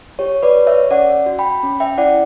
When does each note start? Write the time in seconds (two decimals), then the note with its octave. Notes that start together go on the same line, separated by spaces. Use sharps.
0.19 G4 C#5
0.43 B4 D5
0.55 G4
0.67 C#5 E5
0.91 C#4 D5 F#5
1.26 F#4
1.39 G5 B5
1.63 C#4
1.80 E5 G5
1.98 E4 D5 F#5